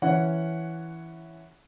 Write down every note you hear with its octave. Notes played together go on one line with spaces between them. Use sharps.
E3 C#4 F#5